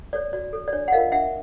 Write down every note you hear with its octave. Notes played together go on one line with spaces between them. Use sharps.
A4 C#5 D5
F#4 D5
A4 C#5
D5
D4 C#5
F#5
F4 A#4 C#5 D#5 F5
D4 E5 F#5